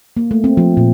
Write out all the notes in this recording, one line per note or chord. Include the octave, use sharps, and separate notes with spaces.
A#3
A3
C4
F3
A#2